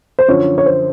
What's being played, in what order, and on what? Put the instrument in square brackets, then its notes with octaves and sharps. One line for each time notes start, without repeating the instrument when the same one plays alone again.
[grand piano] C5
[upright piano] F#2 D3 F3 [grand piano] C#5
[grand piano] C#5
C5